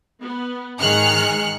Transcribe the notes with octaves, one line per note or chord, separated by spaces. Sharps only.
B3
G#2 D#3 G#4 F6 F#6 C#7